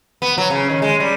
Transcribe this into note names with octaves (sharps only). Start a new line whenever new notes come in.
B3
F#3
C#3
D#3
G#3
G3